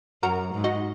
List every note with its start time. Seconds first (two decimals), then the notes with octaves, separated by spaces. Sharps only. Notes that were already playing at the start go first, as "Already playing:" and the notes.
0.23 F#2 F#4 A#4
0.54 G#2
0.64 D#4 F#4